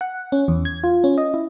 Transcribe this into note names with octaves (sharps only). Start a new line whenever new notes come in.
F#5
C#4
E2
G#6
F4
C#4
D#5
E4